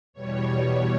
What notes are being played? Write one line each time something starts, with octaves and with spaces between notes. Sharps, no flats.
E2 B2 G3 C#5